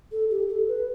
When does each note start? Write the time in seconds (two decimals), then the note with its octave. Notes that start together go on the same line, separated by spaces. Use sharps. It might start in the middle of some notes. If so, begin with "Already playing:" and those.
0.12 A4
0.30 G4
0.49 A4
0.68 B4